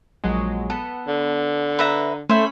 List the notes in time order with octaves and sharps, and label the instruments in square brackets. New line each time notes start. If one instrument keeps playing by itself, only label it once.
[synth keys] A#1 F#3 G#3
[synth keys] B3 [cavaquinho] A4
[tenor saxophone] D3
[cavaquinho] B4 E5 A#5
[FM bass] A3 [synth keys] C#4 B5 [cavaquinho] C5 E5